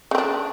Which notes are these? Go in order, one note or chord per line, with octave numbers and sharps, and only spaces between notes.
C#3 C4 D4